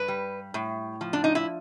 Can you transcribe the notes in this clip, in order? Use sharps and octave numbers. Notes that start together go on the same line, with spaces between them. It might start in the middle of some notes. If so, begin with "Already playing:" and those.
Already playing: G2 B4
G3
A2
F3
D4
D#4
E4